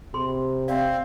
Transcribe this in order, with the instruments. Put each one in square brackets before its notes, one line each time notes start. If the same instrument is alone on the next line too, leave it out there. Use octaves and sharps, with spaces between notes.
[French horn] C3 [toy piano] G#4 B5 C6
[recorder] C4 [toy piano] D5 [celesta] E5 F5